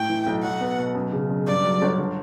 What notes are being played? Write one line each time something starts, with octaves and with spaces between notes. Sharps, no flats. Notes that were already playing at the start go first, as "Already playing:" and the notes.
Already playing: A2 G5
E3
B1
F#3 F#5
B3
B2
F#2
C#3
F#1
G2 D5
F#3
G1
D3